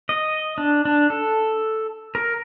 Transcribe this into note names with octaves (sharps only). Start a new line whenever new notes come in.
D#5
D4
D4
A4
A#4